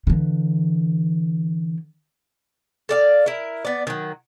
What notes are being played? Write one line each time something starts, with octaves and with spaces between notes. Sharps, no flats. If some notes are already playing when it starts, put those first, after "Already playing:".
D3 E3
A4 D5 F5
E4 A#4
B3 D5
D#3 F#3